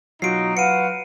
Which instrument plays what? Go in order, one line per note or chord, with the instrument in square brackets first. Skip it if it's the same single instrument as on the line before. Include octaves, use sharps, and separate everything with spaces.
[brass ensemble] B2 D#4 [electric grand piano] F#3 F4 F#4 [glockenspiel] C7 D7
[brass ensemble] B4 F5 [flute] F#5 [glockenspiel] C#7 D#7